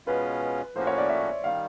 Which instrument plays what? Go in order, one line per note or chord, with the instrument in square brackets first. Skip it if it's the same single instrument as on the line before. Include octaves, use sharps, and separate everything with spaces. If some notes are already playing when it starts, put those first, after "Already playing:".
[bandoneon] B2 G#3 C#4 F4 [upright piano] B4
[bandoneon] A2 F3 A#3 C#4 F#4 [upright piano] C5
[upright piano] C#5
D5
E5
[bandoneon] D#3 G3 [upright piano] F5